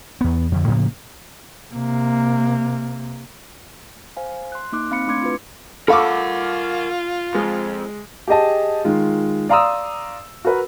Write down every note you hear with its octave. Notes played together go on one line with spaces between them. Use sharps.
E2 B3
F2 D3
A2 C#3 F3 A#3
C3 A#3
C5 F5 G#5
C6 F#6
A#3 D#4 D6 F#6
C4 F5 B5 C#7
A3 D4 C6 D6 G#6 C#7
E4 F4 B4
F4 A4 A#4 F5 F#5 B5 C#6 D6
F2 G#3
G4 G#4 D#5 A5
D#3 G#3 F4
D5 F5 A#5 C6 D#6 E6
F#4 A#4 B4